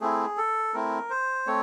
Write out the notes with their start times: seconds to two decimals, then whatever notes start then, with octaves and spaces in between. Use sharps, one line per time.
0.01 A3 C4 E4 G#4
0.37 A4
0.74 A3 C4 E4 A#4
1.10 C5
1.47 A3 C4 C#5